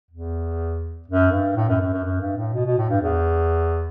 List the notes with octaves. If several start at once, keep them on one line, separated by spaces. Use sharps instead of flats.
E2
F#2
G2
A2
F#2
F#2
F#2
F#2
G2
A2
B2
B2
A2
G2
E2